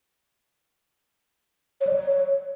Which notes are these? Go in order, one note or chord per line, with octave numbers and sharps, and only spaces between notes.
C#5
D5
C#5